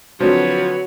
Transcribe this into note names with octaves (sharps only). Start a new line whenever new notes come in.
D3 F3 F#3 C4 F#4 B4 C#5